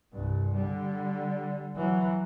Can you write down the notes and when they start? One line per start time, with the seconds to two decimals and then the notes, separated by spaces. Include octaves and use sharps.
0.13 C2 G2
0.55 D3 G3
1.76 E3 F#3